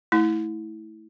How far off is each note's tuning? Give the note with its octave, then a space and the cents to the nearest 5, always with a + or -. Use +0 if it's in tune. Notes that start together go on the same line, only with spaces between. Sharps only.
A3 +0 E4 -20